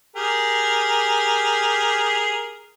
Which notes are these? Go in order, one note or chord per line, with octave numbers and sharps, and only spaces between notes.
G4 G#4 A#4